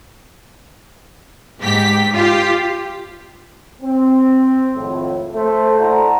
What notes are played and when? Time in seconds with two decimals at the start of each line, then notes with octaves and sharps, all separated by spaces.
1.60 G#2 G4 B6
2.13 F4 G4
3.82 C4
4.74 G#1 F2 A2
5.34 A3 C5
5.80 E4 F#4 D5 E5 A5 A#5